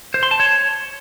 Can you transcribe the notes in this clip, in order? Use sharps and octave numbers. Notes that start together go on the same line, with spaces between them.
C5
C6
A5
C#5